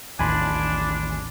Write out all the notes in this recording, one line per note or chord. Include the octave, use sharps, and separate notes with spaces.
A1 D#2 D4 G#5 B5 C6